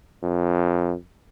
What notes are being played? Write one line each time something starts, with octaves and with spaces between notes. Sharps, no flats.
F2